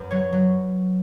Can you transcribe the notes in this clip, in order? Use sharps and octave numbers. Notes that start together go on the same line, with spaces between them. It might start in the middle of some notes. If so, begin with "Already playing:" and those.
Already playing: F#2 B4
F#3 C#5
F#3